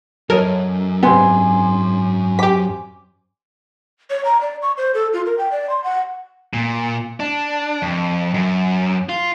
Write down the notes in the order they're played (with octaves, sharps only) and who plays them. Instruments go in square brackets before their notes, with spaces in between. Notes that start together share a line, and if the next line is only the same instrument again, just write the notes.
[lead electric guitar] F#2 [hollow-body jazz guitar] A4 C#5 D#5 [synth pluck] A#4
[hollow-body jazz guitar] G#2 C4 [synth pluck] C3 B3 [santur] G#5 C6
[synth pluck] G4 B6 [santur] D6
[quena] C#5
A#5
D5
C#6
C5
A4
F4
A#4
G5
D5
C6
F#5
[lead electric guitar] A#2
D4
F2
F#2
F4